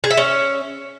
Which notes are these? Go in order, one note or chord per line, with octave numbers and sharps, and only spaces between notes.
G#4
E5
C#4